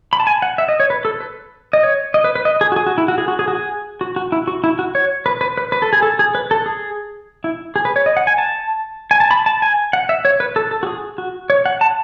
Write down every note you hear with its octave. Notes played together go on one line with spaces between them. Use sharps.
B5
A5
G#5
F#5
E5
D#5
C#5
B4
A4
B4
D#5
C#5
D#5
B4
B4
D#5
G#4
F#4
G#4
F#4
E4
F#4
G#4
F#4
G#4
F#4
G#4
F#4
F#4
E4
F#4
E4
F#4
C#5
B4
B4
B4
B4
A4
G#4
A4
G#4
B4
A4
G#4
E4
G#4
B4
C#5
D#5
F#5
G#5
A5
G#5
A5
B5
A5
G#5
F#5
E5
C#5
B4
A4
A4
F#4
G#4
F#4
C#5
F#5
A5